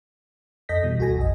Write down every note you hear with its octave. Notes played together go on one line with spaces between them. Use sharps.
F2 A4 D#5 G6 A#6 B6
B2 E3 G3
D2 F#4 A4 G#5 A#6
A#1 F2 D#5